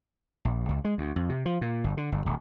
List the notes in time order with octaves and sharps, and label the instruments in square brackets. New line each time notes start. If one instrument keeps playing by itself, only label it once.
[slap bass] A#1
C#2
G#3
D2
F2
C3
F3
A#2
G1
D3
G1
D1